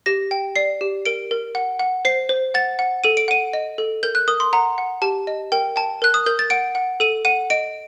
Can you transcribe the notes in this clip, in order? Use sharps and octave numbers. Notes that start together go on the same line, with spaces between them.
G4 A#6
G5
D5 C7
G4
A#4 D7
A#4
F#5
F#5
C5 C7
C5
F#5 A6
F#5
A4 D#7
D7
F#5 D#7
D#5
A4
A#4 G6
F#6
A#4 D#6
C6
F#5 A#5
F#5
G4 A5
D#5
A#4 G5
G5 A5
A#4 F#6
D#6
A#4 G6
A6
F#5 D7
F#5
A4 D#7
F#5 D#7
D#5 D7